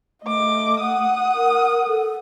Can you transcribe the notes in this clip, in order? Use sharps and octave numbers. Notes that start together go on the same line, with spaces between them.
A3 D#5 D6
F#5 D#6
A#4
A4